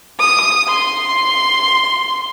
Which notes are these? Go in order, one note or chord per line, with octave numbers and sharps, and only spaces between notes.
D#6
C6